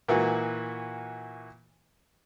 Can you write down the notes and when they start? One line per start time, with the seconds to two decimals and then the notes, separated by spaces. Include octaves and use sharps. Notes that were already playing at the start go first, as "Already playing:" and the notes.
0.08 A#2 E3 A#3 F#4